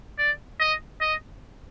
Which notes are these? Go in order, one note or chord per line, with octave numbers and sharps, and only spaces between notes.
D5
D#5
D#5